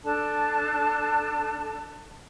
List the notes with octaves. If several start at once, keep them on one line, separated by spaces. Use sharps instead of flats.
D4 A4 A5